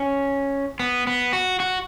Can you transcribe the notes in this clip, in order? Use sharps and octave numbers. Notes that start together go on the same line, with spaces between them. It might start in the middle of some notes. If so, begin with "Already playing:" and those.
Already playing: C#4
B3
B3
F#4
F#4